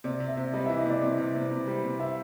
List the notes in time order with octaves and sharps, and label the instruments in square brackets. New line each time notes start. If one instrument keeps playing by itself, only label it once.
[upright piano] C3 [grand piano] D5
[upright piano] C3
[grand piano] E5
[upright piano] C3
[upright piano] G3 [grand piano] D#5
[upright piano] E3 [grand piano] E5
[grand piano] D#5
[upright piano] C3 [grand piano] D5
[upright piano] C3
C3
C3
C3
G3
C3
[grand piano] E5